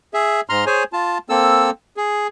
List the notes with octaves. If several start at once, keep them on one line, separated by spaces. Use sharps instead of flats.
G#4 E5
G#2 A#5 C6 F6
G#4 C5 C#5 G#5
F4 A5
A#3 C4 A4 E6
G#4